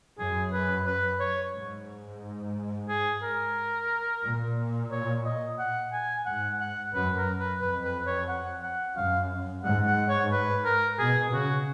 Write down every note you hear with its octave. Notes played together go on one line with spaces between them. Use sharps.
F#2 G#4
B4
B4
C#5
G#2
G#4
A#4
A#2
C#5
D#5
F#5
G#5
G#2 F#5
F#5
F#2 B4
A#4
B4
F2 B4
B4
C#5
F#5
F#5
F#2 F5
G#2 F#5
F#5
C#5
B4
A#4
B2 G#4
C#3 F#4